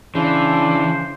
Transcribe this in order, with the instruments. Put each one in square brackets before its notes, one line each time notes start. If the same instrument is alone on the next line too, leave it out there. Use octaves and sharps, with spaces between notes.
[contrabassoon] C#3 [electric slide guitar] E3 [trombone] D4 [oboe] C5